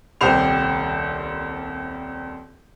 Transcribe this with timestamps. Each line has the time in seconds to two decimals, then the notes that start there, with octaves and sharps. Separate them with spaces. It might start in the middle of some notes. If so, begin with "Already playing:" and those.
0.21 D#1 C2 G4 C5 C6 F7